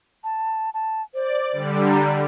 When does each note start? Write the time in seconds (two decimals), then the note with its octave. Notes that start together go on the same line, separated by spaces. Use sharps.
0.24 A5
0.74 A5
1.15 C5 D5
1.52 D3 G3
1.89 A#5